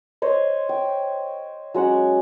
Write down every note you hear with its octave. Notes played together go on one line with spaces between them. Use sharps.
C5 C#5 D#5
G5
F#3 G#3 C#4 F#5